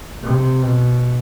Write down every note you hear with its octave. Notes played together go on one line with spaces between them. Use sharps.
C3
B2